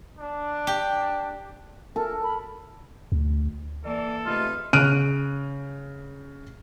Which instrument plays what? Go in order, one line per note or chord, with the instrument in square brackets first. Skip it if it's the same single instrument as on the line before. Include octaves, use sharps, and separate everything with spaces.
[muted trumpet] D4
[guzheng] G4
[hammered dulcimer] A4 [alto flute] A#4
[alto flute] B5
[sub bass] D2
[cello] E3 A#3 [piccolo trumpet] A4 [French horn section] D5
[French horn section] C3 G#3 A3 [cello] D#4 B4 [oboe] F4
[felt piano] C#3 F6 F#6 D7 D#7